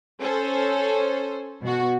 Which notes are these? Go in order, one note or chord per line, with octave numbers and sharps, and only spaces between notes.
C#4 A4 C5
B2 F#4